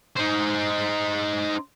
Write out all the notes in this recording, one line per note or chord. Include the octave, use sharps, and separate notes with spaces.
D#4 C5